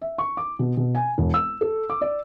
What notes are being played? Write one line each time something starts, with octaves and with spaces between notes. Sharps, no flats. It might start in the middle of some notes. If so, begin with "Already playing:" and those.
E5
C#6
D6
B2
B2
G#5
E1
E6
A4
D6
D5